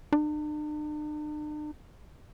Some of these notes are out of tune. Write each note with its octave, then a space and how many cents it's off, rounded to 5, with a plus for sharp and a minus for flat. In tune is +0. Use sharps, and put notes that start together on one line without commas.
D4 +45